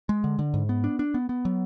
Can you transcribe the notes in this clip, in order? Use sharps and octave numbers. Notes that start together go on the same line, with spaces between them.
G#3
D3
D3
G#2
B3
D4
D4
B3
B3
F#3